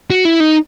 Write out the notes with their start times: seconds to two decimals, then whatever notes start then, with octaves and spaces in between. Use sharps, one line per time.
0.10 F#4
0.25 E4
0.40 D#4